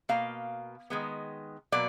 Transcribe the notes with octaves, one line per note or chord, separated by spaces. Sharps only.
B2 A#3 F5
D#3 G#3 B3
B2 F#3 A#3 D5